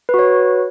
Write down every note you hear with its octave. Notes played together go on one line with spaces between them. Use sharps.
F#4 B4 C#5